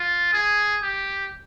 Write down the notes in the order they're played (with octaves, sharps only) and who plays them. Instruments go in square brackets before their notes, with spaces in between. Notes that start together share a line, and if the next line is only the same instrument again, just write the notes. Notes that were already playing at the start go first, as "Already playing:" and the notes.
Already playing: [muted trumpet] F4
G#4
G4